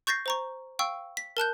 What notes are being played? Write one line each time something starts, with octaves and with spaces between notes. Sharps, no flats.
C#6 G6 A6 A#6 C7
C5 A#5 C#6
F5 G5 C#6 E6
B6
A#4 A5 F#6 G6